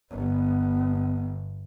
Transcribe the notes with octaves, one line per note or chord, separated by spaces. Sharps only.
G1 B3